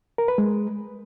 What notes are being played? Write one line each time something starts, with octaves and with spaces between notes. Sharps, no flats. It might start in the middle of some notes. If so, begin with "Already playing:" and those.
A#4
B4
G#3